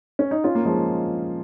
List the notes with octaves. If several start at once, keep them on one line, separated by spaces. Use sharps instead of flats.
C#4
D#4
C#4 F4
A#3
F3 G#3